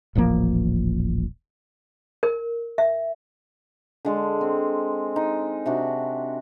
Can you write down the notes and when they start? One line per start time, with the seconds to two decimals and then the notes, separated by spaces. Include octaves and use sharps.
0.15 D#1 A1 F3 A#3
2.23 A#4
2.78 E5
4.05 D3 G#3 A4
4.41 C4
5.16 D#4
5.66 C3 D4 F#4